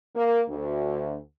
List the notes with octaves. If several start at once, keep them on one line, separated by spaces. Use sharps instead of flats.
A#3
D2